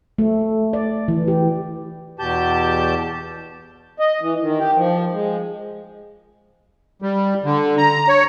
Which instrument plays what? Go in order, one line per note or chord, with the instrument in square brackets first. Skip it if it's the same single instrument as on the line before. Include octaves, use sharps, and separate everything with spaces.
[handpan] A3
D5
E3
G4
[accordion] E2 B2 G4 A5 G6
[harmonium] D#5
E3
D#3
G4
F3
G#3
[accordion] G3
D3
A#5
C#5